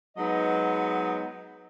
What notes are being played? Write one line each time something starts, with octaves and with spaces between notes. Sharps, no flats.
F#3 G#3 B3 D#4 D#5